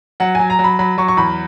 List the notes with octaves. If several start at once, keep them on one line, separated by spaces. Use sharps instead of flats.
F#3 F#5
F#3 G#5
A#5
F#3
B5
F#3 B5
F#3 C#6
C#6
E2 B5